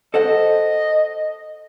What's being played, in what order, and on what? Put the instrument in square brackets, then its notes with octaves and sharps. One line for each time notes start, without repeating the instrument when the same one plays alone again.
[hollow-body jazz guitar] A4 C5 F#5 [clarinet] D#5